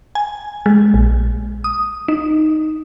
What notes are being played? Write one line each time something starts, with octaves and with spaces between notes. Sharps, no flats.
G#5
G#3
A#1
D#6
D#4